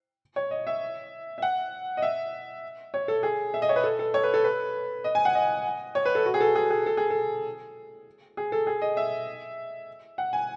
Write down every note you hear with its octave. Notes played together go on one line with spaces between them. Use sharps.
C#5
D#5
E5
E5
F#5
D#5
E5
C#5
A4
G#4
E5
D#5
C#5
B4
A4
A4
C#5
B4
A4
B4
D#5
G#5
F#5
D#5
C#5
B4
A4
F#4
G#4
A4
G#4
G#4
A4
G#4
A4
G#4
A4
G#4
D#5
E5
F#5
G#5